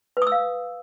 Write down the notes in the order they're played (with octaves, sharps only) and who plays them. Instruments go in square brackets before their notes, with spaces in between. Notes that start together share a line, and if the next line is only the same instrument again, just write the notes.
[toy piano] B4
D#6
E6
F5